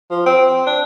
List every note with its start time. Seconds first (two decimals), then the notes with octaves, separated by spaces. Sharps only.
0.11 F3
0.26 C4
0.66 D4